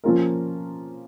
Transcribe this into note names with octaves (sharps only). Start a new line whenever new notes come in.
F3 A#3 C#4 F4 A#4